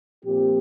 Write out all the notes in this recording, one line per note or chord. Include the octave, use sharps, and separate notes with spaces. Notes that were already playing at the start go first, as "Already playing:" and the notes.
A#2 F3 C4 G4